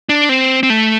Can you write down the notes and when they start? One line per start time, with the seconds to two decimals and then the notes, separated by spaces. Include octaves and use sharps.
0.09 D4
0.29 C4
0.63 C4
0.70 A3